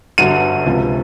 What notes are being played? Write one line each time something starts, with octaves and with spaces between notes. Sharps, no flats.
G1 G2 D3 F#3 D#7
C#2 C3 F3